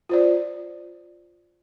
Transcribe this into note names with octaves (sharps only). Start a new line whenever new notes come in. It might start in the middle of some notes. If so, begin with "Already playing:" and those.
F4 C5 D5